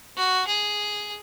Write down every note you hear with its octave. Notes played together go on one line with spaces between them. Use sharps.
F#4
G#4